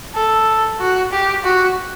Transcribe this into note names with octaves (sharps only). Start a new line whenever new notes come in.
A4
F#4
G4
F#4